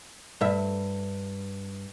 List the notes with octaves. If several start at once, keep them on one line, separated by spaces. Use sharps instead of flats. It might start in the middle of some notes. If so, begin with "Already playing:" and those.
G2 E5